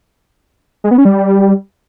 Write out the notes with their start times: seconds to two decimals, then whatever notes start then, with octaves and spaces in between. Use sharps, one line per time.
0.84 G#3
0.91 B3
0.98 C#4
1.05 G3